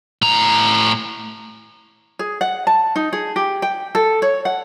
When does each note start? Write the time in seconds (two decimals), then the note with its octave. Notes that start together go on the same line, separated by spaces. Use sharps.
0.22 A2 A#5
2.19 G#4
2.41 F#5
2.67 A5
2.96 D#4
3.13 G#4
3.36 G4
3.62 G5
3.95 A4
4.22 C#5
4.45 F#5